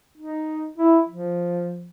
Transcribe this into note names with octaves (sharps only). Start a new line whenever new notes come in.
D#4
E4
F3